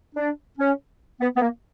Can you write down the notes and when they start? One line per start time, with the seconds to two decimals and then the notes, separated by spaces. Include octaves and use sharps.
0.15 D4
0.58 C#4
1.21 B3
1.36 B3
1.41 A#3